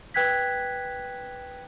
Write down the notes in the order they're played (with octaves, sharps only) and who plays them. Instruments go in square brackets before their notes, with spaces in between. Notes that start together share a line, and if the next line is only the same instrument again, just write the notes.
[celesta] B4 G5 F#6 G#6 B6